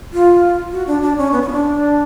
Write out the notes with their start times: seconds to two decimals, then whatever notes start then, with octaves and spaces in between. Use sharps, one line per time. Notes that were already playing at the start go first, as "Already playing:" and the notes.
0.13 F4
0.73 F#4
0.87 D4
1.02 D4
1.18 C#4
1.32 B3
1.42 C#4
1.48 F4
1.52 D4